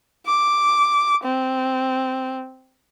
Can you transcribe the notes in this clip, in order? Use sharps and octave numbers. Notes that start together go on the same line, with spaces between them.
D6
C4